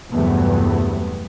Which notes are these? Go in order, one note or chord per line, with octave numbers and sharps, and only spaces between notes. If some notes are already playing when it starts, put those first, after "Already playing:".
E2 G2 C3 F#3 A3 B3